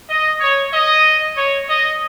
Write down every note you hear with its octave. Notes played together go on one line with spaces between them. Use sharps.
D#5
C#5
D#5
C#5
D#5